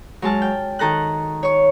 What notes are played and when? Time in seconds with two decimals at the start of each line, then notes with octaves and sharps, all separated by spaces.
0.22 F#3 G#3 A5 F6
0.42 G5
0.79 D#3 A4 A#5 F#6
1.43 C#5 C#6